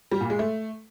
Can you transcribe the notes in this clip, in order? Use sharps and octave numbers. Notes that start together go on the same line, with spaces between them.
G3
A#2
G#3
A3